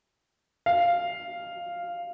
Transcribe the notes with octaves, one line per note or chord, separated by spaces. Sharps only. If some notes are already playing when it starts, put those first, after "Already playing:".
F5